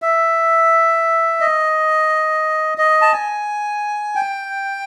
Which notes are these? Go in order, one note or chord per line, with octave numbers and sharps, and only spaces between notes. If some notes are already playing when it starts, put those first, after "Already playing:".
E5
D#5
D#5
A5
G#5
G5